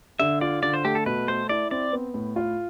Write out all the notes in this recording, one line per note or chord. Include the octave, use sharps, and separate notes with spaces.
D3 E5
F4 D5
D3 D5
C5
A3 G4
A4
B2 B4
A3 C5
E4 D5
C4 D5
B3
A2
F4